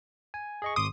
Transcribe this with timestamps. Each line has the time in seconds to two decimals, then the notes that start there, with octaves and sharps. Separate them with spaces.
0.34 G#5
0.62 G#4 D#5 C#6
0.76 G#1 C6 D6 D#6